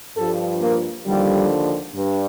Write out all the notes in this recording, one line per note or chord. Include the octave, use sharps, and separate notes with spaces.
G2 F3 A4
A#3
D#2 D3 F3 G3
G2